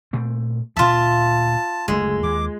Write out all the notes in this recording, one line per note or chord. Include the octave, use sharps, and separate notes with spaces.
A#2 A3 C4
D2 A#2 F4 E5 A5
F#1 D2 G#3 A3
D#2 D6